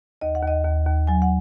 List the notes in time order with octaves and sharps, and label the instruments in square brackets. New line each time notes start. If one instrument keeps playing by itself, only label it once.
[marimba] D#2 D#5
F#5
D#2 D#5
D#2
D#2
F#3 G#5
F#5